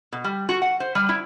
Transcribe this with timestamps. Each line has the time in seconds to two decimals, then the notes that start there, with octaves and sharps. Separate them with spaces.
0.13 B2
0.24 G3
0.49 F#4
0.62 F#5
0.80 C5
0.95 G3
1.09 E4